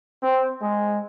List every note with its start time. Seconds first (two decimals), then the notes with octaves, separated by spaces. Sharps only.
0.22 C4
0.61 G#3